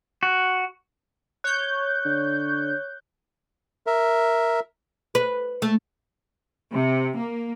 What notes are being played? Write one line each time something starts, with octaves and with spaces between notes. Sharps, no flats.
F#4
C#5 F#6 G6
D3
A#4 E5
B4
A3
C3
A#3